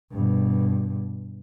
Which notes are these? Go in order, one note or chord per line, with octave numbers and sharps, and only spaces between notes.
G2 B2